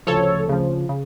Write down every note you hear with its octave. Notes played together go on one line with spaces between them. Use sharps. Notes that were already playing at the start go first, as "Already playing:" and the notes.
D2 C#3 F3 A4 C#5
D2 C#3 F3
C#3